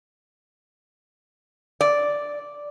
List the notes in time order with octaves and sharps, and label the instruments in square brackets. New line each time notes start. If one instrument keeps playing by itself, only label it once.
[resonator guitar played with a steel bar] D5